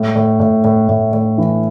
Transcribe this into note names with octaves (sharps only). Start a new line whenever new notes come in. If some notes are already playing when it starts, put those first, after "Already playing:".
Already playing: A2
A2
A2
A2
A2
A2
E3